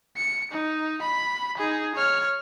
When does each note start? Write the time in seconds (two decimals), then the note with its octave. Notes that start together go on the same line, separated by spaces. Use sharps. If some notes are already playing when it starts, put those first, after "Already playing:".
0.17 C#7
0.51 D#4
1.02 B5
1.58 D#4 G#4
1.96 C#5 F6